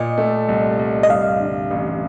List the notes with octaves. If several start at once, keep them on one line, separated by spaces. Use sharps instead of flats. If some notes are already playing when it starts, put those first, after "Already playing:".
Already playing: A#2 D#5
A3
C2
C2
D#5
G2 F5
D3
A1